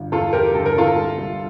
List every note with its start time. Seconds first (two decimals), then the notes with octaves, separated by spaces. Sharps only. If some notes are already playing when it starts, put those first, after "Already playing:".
Already playing: G1
0.12 E2 F4 A4
0.33 E2 G4 A#4
0.55 G1 A4
0.66 A#4
0.75 G1 F4 A4
0.96 C2
1.18 C2